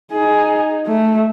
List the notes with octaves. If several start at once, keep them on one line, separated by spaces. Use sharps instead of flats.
D#4 G#4
A3